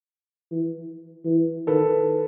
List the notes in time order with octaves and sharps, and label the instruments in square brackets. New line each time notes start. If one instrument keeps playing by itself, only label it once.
[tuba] E3
E3
[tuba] D#3 [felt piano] A4 B4